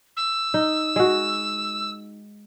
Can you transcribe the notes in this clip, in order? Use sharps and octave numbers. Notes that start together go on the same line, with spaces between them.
E6
D#4
G#3 F#4